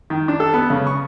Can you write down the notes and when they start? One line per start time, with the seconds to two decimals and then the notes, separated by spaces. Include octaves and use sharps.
0.10 D#3
0.28 D4
0.40 A4
0.54 B3
0.70 C#3
0.87 C#6